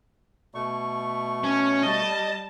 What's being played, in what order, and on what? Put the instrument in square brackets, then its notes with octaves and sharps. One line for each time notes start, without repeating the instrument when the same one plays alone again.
[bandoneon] B2 A3 C#6
[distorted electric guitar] C#4
[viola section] G3 A5 [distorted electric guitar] D#5